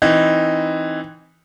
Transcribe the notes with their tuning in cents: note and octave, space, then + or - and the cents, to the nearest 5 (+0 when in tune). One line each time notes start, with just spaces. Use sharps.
E3 +0 C4 +5 D#4 +0